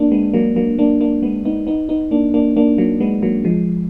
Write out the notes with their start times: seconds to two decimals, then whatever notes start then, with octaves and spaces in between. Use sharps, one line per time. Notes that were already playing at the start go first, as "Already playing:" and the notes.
Already playing: A#3 D4
0.11 G#3 B3
0.33 F#3 A#3
0.56 F#3 A#3
0.79 A#3 D4
1.01 A#3 D4
1.22 G#3 B3
1.45 B3 D#4
1.67 B3 D#4
1.89 B3 D#4
2.11 A#3 D4
2.34 A#3 D4
2.56 A#3 D4
2.78 F#3 A#3
3.00 G#3 B3
3.22 F#3 A#3
3.44 F3 G#3